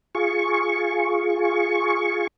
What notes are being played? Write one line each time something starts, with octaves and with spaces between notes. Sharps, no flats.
F4 G#4 C#6